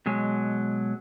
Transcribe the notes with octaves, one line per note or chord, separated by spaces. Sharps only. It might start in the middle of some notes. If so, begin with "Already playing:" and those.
B2 F#3 G#3